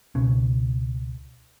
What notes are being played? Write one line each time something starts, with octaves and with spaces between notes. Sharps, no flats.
C#2 B2 C#4